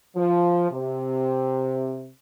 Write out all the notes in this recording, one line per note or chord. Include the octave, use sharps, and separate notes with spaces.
F3
C3